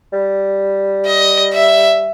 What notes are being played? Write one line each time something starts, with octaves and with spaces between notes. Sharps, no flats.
G3
D#5
E5